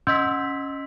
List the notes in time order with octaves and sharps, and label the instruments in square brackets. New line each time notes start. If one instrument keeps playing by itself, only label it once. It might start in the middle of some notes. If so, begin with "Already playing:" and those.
[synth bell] C#4 D#5 B6 [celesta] C6 E6 G6